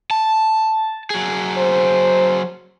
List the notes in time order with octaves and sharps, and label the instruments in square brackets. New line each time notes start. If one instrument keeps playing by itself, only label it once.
[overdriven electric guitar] A5
F#3 G#4
[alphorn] C5